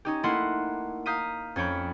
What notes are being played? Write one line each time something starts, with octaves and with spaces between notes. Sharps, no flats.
C#4 D#4 G4
A3 A#3 E4 D#5 F#5 C6
F5 A#5 D#6 G6 B6 D#7
F2 C#4 C#5 G5 B5